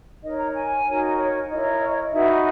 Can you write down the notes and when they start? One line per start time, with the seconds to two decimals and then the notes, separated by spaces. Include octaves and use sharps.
0.23 D#4 A#4 C#5 D#5
0.38 A#5
0.55 G#5
0.87 D#4 F#4 A#4 C#5
1.18 C#5
1.49 E4 A#4 C#5 D#5
2.12 D#4 F#4 B4 E5